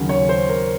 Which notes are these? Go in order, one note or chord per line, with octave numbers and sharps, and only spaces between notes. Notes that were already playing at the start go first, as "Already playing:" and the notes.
Already playing: D#2 C#3 F#3 C#4
C#5
C5
A#4